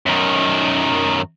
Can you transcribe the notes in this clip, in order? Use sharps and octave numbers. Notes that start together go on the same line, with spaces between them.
F#2 D#3